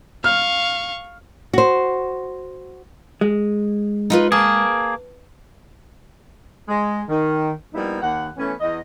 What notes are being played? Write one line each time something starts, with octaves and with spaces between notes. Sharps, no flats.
F5 C#6 F6
F#4 C5
G#3
D#4 F4 B4
A#3 G#4 A5
G#3
D#3
F3 G3 A#3 B3 D#4 E4
D#2 F#5
E3 A3 B3 C#4
E2 D#5